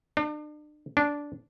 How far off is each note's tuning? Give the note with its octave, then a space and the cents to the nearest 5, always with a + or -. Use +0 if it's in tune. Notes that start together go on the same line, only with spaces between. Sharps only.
D4 +40
D4 -10